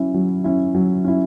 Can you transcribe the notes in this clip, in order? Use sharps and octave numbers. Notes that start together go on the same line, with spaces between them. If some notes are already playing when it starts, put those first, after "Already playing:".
Already playing: F#3 C#4 E4
F#3
C#4 E4
F#3
C#4 E4